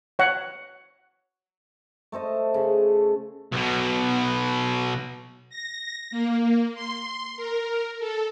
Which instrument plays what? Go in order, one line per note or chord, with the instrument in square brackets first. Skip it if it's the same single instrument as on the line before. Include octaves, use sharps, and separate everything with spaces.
[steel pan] C#5 F#5
[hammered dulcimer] A3 A4 C5 D#5
C#3
[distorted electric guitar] B1 B2
[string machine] A#6
A#3
C6
A#4
A4